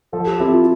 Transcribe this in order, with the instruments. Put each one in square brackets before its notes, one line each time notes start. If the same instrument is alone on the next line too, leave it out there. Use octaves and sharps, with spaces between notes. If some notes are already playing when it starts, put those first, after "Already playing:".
[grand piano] F3 [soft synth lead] A4
[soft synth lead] G4
[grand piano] C4 E4 A4 [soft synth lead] G4
[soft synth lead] F4